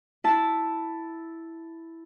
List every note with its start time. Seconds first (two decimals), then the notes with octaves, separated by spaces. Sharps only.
0.24 E4 A5